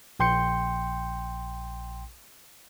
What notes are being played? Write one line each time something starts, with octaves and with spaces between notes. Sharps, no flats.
A#1 G5 C6 G6 C#7